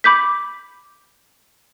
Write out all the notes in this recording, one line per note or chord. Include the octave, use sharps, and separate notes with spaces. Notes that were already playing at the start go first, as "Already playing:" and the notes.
B5 D6 G6 B6